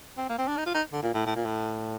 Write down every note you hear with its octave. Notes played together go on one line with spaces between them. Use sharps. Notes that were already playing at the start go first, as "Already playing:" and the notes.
C4
A#3
C4
D4
D#4
F4
D#4
D3
A#2
A2
A2
A#2
A2